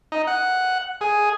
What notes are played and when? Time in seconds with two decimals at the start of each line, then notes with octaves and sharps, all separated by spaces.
0.12 D#4
0.27 F#5
1.01 G#4